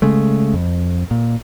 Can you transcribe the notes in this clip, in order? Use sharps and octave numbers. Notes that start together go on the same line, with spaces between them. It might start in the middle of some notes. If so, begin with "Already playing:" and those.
C#3 G#3 A3
F2
A#2